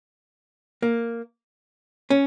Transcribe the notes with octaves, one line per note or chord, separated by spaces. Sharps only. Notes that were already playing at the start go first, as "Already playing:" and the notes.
A#3
C#4